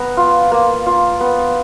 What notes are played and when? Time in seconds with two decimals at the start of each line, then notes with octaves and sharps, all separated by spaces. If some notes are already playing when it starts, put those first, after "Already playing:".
Already playing: B3 A#5
0.17 F4
0.52 A#3
0.86 F4
1.21 B3